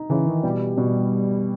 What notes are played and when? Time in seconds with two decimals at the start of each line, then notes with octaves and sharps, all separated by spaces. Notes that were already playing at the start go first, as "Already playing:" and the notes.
Already playing: D#4
0.10 C#3 E3
0.27 D#3
0.43 B2 G3
0.77 B2